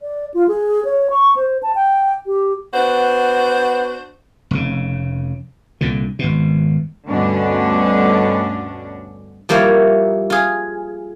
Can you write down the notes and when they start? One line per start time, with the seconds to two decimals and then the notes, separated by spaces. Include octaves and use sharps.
0.01 D5
0.34 F4
0.48 G#4
0.85 C#5
1.10 C#6
1.36 C5
1.63 A5
1.75 G5
2.26 G4
2.73 B3 D4 F#4 C5
4.51 F1 C#3
5.81 C2 A#2 D3
6.19 G#1 B2
7.08 D2 G2 B2 D3 C#4 D4
9.49 F3 G3 A#3 E4 C#5
10.30 F4 G#4